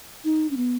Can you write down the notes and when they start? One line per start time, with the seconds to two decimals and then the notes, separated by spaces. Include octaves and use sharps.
0.24 D#4
0.51 C#4
0.57 B3